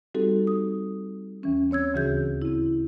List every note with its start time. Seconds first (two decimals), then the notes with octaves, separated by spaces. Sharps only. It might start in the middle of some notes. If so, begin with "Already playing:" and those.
0.15 G3 C4 D#4 F#4 G4 A4
0.47 D#6
1.43 D#2 E3 C#4
1.71 C4 C#5 E6 G#6
1.94 D2 C#3 E3 F#4 G#4 G6
2.42 C4 E4